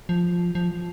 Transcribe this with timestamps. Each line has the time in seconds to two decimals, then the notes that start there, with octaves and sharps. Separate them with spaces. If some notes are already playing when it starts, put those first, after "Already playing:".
0.09 F3
0.55 F3